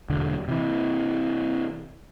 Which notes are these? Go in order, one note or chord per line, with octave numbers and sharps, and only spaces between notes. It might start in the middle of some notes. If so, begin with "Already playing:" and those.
E1 D3
C3 E3